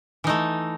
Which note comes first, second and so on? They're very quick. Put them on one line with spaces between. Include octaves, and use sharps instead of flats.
E3 D#4 A3